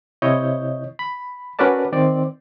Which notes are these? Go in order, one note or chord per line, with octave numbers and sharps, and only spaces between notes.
C3 E4 C#5 D#5 G6
B5
C#4 F#4 A#4 B4 D5 A5
D#3 C4 D5